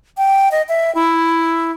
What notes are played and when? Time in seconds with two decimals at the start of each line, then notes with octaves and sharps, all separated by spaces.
0.17 G5
0.52 D#5
0.69 E5
0.95 E4